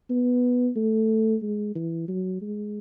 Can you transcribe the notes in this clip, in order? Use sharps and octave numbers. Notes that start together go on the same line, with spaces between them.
B3
A3
G#3
E3
F#3
G#3